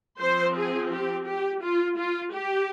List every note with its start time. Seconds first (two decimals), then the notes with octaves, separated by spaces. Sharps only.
0.22 F3 C4 C5
0.57 G#4
0.93 G4
1.27 G4
1.63 F4
1.98 F4
2.33 G4